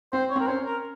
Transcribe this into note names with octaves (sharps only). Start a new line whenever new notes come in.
C4 C5
C#5
C4 A#4
C#4 C5
A#4